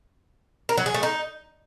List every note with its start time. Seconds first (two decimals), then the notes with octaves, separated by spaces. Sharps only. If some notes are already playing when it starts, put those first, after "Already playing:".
0.69 A#4
0.78 F#3
0.86 G#4
0.94 A3
1.03 D#4